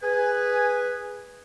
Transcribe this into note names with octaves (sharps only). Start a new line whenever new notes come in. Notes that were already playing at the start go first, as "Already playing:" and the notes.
G#4 B4 G#5